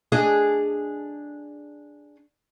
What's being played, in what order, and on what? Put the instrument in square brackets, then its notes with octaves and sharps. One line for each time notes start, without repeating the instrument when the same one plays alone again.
[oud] D4 G#4 D#5